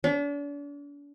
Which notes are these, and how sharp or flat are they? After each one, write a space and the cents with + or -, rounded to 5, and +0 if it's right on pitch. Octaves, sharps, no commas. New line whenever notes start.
D4 -40